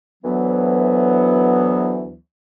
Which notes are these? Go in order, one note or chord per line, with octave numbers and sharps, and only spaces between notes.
D2 E3 F#3 B3